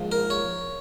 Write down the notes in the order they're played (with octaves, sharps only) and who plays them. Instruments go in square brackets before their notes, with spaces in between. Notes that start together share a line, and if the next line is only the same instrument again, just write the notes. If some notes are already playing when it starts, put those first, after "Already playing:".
Already playing: [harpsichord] A#1 G#2 F3
A#4
C#5